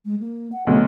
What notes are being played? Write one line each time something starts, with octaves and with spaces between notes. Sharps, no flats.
G#3
A#3
F#5
D2 B2 F#3 A3